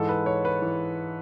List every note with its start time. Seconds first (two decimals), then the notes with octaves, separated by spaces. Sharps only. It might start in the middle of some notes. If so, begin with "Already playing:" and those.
Already playing: G#2 E3 G#3 A4
0.09 B4
0.26 C#5
0.45 B4
0.62 E3